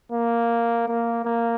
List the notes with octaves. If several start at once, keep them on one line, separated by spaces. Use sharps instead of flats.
A#3
A#3
A#3